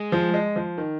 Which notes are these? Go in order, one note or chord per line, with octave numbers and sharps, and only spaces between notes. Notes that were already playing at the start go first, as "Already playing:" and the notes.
Already playing: G#3
F3
G#3
F3
D#3